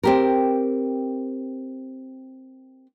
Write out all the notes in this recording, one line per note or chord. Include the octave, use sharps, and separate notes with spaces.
C4 G4 A#4